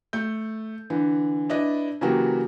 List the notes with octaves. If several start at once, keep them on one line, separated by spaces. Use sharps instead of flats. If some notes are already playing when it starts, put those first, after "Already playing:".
A3 G6
D3 E3
D4 E4 B4 D5 D#5
C#3 E3 F#3 A#3 F#4 G4